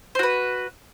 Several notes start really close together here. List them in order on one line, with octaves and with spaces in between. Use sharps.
C5 F#4 B4